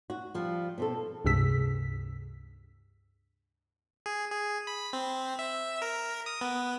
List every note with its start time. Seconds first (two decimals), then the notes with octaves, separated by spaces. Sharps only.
0.10 F#4
0.34 F3 G3
0.78 B2 C4 A4
1.25 C#2 G2 C3 G#4 E6 B6
4.06 G#4
4.32 G#4
4.67 B5
4.93 C4
5.39 E5
5.82 A#4
6.26 D#6
6.41 B3